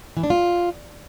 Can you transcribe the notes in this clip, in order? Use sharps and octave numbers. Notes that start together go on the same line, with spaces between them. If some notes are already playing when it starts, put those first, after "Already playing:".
E3
D4
F4